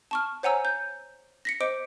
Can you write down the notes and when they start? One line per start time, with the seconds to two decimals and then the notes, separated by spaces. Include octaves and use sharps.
0.11 A5 C#6 F6
0.43 C5 C#5 F#5 G#5 A#5 E6
0.65 G6
1.45 A#6 B6 C#7
1.60 C5 D#5 D6 D7